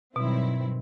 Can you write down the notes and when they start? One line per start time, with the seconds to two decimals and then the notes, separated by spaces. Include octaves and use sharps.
0.16 G2 B2 D#3 F#3 C4 E4